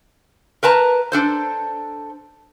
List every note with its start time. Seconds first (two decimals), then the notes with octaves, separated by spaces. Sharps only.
0.63 A#4 B4 A5 A#5
1.12 D4 A4 C5